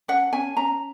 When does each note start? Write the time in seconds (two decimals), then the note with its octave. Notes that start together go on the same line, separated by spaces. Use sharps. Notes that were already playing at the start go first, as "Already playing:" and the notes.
0.08 C#4 F#5
0.33 C#4 G#5
0.57 C#4 A#5